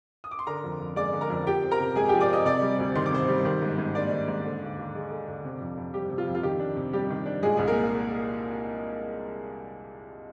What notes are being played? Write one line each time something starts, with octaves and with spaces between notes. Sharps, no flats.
D#6
D6
C6
D3 A#4 A#5
F2
F2
G#3 D5 D6
D3
A#4 A#5
F2
F3 G4 G5
C4
A#4 A#5
C3
G#3 G#4 G#5
F3 G4 G5
D5 D6
C4 D#5 D#6
C3 D5 D6
G3
D2
D#3 C6
D6
C3 C5 C6
G3
D#3
G#2
G#2
A#3 D4 D5
D#3
G#2
D3
D#2
D#2
G#3
D3
D#2
C3
F2
F2
G3 G4
C3
F4
F2
F4
D#3 G4
D4
C3
G3 G4
D#3
D4
A#2 G#3 G#4
C2 G#4
A#3 A#4